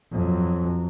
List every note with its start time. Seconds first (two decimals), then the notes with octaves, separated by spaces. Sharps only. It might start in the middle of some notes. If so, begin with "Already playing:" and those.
0.12 F2 F#3